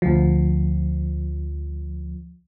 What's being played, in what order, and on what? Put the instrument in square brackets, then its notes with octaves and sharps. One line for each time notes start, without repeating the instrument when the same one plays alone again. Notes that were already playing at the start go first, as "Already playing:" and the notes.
[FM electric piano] D2 F3